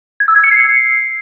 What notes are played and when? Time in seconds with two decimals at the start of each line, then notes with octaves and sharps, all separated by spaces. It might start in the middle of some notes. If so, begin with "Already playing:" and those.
0.20 G#6
0.28 E6
0.36 G#6
0.44 C#7
0.51 C7